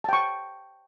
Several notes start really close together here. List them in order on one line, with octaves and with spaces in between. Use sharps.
A5 G5 C#6